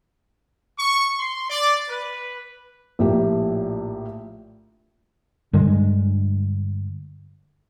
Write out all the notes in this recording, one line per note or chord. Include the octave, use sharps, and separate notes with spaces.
C#6
C6
D5
B4
A#1 A2 A#3 G4
G2 D3 G3 G#3